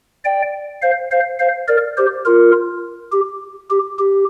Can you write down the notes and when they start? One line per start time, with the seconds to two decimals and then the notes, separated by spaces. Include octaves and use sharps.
0.25 D5 G5
0.82 C5 F5
1.11 C5 F5
1.39 C5 F5
1.68 A#4 D5
1.97 G4 C5
2.25 F4 A#4
3.12 G4
3.70 G4
3.99 G4